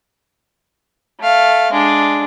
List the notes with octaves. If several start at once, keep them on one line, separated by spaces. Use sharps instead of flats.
A3 F5
G#3 D4